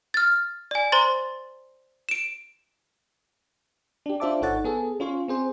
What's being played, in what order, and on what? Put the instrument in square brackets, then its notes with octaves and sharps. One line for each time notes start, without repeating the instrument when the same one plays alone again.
[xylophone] F6 A6
D5 G#5
C5 A#5 C6 A6
D7 E7
[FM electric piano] D4 G4
D4 F4 C5 E5 A5 D6
G#1 D#4 A4 C#5 F#5 A6
B3 G#4 A4
C#4 F4 C#5 C6
C4 G#4 C5